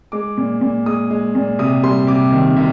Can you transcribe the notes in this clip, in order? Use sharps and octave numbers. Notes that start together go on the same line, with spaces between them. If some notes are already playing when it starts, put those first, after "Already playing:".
G#3 D6
A#2
A#2
G#3 D#6
G#3
A#2
C3 D#6
G3 C6
C3 D6
D#3
C3